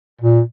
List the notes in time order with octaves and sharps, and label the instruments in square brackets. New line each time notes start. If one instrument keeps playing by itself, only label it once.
[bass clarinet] A#2